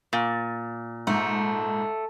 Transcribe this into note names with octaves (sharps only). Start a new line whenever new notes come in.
A#2
G#2 A3